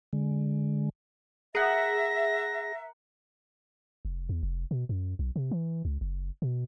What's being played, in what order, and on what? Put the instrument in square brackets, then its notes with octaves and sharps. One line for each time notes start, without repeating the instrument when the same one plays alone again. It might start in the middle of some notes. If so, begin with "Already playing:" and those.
[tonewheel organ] D3 G#3
[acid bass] G#4 [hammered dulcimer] A#4 F#5 [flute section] E5 [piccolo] A#6
[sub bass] F1
E2
F1
B2
F#2
B1
C3
E3
C#2
F#1
B2